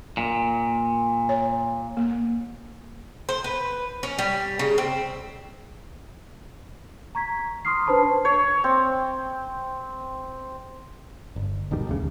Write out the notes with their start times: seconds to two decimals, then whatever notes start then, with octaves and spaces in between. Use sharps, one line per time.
0.17 A#2
1.29 C#5
1.97 A#3
3.29 C5
3.44 B4
4.03 C#4
4.19 G3
4.59 C#3
4.78 C4
7.15 A#5 C#6 G#6 B6
7.65 C6 C#6 D#6 F6 C7
7.86 D4 B4 C5 A5 B5 C#6
8.25 C#5
8.64 C4
11.36 G1
11.71 D#1 B2 D#3 G3
11.87 E1 D2 C#3